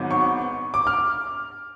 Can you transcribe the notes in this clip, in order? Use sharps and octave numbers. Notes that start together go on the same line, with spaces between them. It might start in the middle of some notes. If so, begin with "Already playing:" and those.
Already playing: G#1 G#2 F#3 B3
C#6
D6
F6